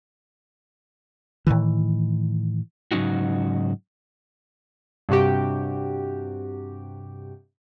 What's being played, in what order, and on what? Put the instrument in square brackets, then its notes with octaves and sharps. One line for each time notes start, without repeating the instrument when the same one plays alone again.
[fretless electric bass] A2 C3 D#3 E3
[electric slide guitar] G#2 C#3 F#3 C#4 D#4 F#4
[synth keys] G2 C3 F#4 G4